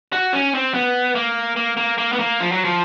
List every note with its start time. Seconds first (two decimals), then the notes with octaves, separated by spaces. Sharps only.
0.13 F#4
0.33 C#4
0.55 C4
0.74 B3
1.15 A#3
1.56 A#3
1.77 A#3
1.98 A#3
2.13 B3
2.19 A#3
2.40 F3
2.52 F#3
2.65 F3